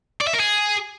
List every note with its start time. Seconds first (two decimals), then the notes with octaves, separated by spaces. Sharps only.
0.21 D5
0.27 E5
0.33 A#4
0.40 G#4